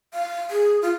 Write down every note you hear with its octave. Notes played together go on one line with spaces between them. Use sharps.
F5
G#4
F4